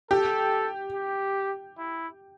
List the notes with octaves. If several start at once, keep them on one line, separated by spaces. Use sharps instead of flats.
G4 A4
G4
E4